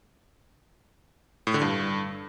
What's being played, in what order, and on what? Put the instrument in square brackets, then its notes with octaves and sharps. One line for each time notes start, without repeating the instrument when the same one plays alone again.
[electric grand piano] A2
D3
G2